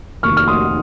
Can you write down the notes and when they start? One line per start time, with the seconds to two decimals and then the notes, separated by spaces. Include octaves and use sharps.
0.23 F1 D#2 D#3 C#6 F6
0.37 F6
0.48 C6 D#6